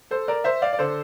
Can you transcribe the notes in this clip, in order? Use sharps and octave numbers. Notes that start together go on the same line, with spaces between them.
A4 C5
A#4 D5
C5 E5
D5 F5
D5
D3 A4 C5